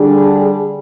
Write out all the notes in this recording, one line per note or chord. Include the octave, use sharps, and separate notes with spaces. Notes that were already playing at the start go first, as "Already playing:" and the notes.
Already playing: D3 G3 D4 G#4